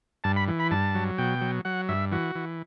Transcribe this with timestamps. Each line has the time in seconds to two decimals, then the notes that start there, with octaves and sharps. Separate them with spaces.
0.24 G2 A5
0.36 B5
0.48 E3
0.59 B5
0.71 G2 A5
0.95 F#3
1.18 B2 G5
1.41 F#3
1.65 F#3 F#5
1.89 G2 E5
2.12 E3 F#4
2.35 E3